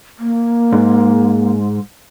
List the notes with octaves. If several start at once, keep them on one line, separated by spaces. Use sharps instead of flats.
A#3
G#2